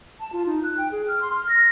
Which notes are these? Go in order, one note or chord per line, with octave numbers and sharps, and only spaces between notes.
A5
F4
D#4
F#6
G5
G#4
F6
C6
F6
A#6